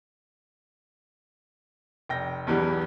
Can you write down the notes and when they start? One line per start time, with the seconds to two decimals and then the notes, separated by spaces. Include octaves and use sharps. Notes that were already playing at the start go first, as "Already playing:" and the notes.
2.09 F1 G5 A#6
2.47 B1 E2 G2 E3 G3